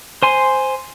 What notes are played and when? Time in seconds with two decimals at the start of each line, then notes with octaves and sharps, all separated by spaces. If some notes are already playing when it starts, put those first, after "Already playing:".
0.23 C5 G#5 C6